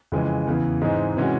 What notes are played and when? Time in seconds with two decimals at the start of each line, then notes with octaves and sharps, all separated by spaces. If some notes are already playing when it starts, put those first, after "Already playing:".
0.12 F2 C#3 E3 G#3
0.47 E2 C#3 E3
0.82 G#2 E3 G#3 C4 D#4
1.17 C3 E3 G#3 C#4 F#4